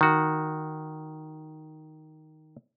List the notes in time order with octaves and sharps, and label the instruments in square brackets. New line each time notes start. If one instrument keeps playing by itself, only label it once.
[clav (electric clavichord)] D#3 F#4